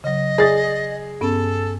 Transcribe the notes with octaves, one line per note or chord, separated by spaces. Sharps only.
C#3 F#3 D#5
G#4 D5 D#6 A6
G2 B3 C#4 A4